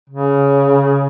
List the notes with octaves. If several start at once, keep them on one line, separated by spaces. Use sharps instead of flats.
C#3